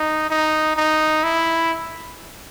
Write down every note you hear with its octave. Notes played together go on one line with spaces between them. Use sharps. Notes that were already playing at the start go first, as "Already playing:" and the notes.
Already playing: D#4
D#4
D#4
E4